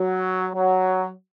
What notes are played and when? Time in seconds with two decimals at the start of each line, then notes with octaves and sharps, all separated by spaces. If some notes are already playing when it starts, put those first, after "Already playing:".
Already playing: F#3
0.55 F#3